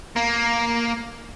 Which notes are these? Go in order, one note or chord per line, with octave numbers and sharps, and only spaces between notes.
A#3